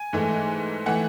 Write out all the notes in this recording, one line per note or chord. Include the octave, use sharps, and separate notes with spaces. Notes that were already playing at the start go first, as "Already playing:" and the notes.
Already playing: G#5
G#2 E3 A3
E3 A3 F#5